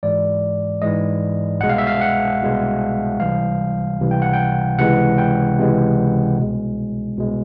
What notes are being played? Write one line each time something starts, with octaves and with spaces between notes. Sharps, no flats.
G#2 E3 G#3 D5
G#2 E3 G#3 D#5
C2 B2 G#3 F#5
F5
E5
F5
F#5
C2 B2 G#3
C#2 C3 E3 G3 F5
C#2 C3 E3 G3
G5
F#5
G5
C#2 C3 E3 G#3 F#5
G5
C#2 C3 E3 G#3
C2 B2 G#3
C2 B2 G#3